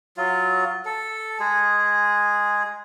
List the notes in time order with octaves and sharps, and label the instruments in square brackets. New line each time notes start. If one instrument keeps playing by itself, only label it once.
[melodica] F#3 F4
A4
G#3 G#4